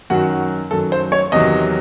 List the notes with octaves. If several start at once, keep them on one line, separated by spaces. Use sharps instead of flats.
F#2 D#3 F#3 F#4
F#2 D#3 F#3 A4
C5
C#5
E2 C3 D#3 F#3 D#5